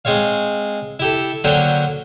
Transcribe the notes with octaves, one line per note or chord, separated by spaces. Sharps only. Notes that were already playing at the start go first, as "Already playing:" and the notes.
G#3 C4 C#5 F5
E4 G4 A4
D3 F#3 A#3 C5 C#5 G5